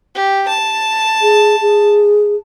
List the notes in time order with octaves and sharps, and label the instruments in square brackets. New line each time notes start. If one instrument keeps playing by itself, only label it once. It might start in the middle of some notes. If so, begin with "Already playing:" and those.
[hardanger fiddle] G4
A5
[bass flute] G#4
G#4